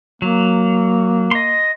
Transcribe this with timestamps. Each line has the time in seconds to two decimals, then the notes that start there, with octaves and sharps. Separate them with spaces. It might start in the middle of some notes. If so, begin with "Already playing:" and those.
0.22 F#3 A#3
1.31 D#5 C6